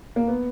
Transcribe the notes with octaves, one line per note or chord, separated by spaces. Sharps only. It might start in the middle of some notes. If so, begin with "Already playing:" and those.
A#3
B3